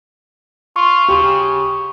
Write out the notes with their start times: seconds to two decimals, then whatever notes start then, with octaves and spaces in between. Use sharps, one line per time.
0.76 F4 C#6
1.08 C#3 G4